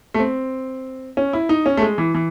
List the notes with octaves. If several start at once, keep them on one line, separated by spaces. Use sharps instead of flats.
A3
C4
C#4
E4
D#4
C#4
A3
G#3
E3
E3